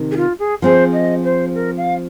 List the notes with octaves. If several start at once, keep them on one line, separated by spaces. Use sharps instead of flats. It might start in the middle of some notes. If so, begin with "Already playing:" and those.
Already playing: C3 D#3
G#4
F4
G#4
F3 C4 G#4 C5
D#5
C5
A#4
F5